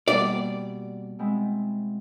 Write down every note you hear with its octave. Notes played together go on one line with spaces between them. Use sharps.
B2 G3 A#3 D5
B2 G#3 C4 E4